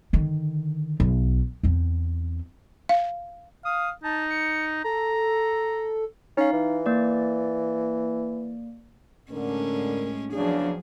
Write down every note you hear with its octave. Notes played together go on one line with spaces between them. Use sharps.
D3 D#3
B1
E2 C4
F5
F5 D#6
D#4 A5
C#7
A4 A#5
C#4 D#4 F5
E3
A#3 D5
A2 D3 G#3 C#4 A#4
E2 C#3 F3 F#3 D4 G#4